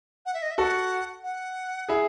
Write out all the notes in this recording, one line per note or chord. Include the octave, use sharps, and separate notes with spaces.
F#5
E5
D#5
E5
F#4 A4 F#5
F#5
E4 G#4